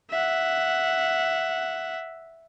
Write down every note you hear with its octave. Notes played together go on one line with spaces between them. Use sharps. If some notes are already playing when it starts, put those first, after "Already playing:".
E5 F#5